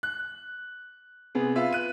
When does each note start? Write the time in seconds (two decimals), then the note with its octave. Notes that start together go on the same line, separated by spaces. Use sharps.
0.03 F#6
1.35 C3 B3 G#4
1.56 F4 B4 E5
1.73 F#6 D#7